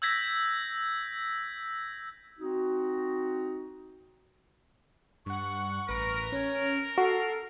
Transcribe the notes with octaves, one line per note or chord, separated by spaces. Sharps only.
E6 G6 G#6 A#6 B6
C4 D#4 F#4
G2 F#5 C#6
A1 A#4 B4 A#6
C#4 C#5
F#4 A4 C7